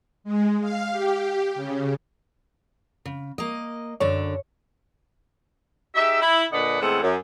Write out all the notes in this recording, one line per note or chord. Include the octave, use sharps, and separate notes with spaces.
G#3
F5
G4
C#3
C#3
A#3 D#5
F#2 D3 D4 C#5
D#4 G4 G#4 E5
E4
A#2 D3 D4 B4 D#5 F#5
E2 A2 G#3 C4 A4 F#5
F#2